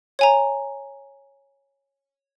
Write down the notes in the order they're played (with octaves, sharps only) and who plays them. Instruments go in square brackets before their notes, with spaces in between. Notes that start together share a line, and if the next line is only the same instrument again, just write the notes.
[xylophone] C#5 G#5 A#5